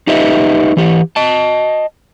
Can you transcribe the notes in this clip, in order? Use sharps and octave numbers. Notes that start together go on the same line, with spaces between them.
D#4 G4 B4 D#5 E5
E3 G4
D#5 A5